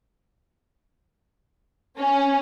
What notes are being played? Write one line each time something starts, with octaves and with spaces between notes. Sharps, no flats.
C#4